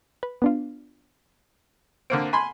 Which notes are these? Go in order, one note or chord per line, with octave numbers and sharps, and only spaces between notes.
B4
B3 D4 F4
D3 A#3 C4 D7
G#5 B5 C6